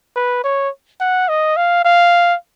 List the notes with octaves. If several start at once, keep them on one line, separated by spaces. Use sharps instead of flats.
B4
C#5
F#5
D#5
F5
F5